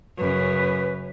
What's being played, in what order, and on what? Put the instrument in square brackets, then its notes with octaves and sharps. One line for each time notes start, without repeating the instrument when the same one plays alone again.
[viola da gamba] F#2 C#3 [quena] B4